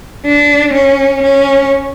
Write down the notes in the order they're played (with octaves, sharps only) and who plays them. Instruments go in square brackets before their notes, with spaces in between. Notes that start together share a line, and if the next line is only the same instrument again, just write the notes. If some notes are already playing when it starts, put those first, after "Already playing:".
[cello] D4
C#4
C#4